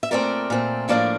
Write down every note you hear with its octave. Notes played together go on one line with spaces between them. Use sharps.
E5
A#2 A3 C4 A#4 D5
A#2 A3 C4
A2 F3 A#3 D4 D5 F5